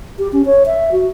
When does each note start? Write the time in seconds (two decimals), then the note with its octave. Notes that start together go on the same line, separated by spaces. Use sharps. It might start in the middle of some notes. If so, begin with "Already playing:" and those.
0.19 G4
0.32 C#4
0.46 C#5
0.66 E5
0.92 F#4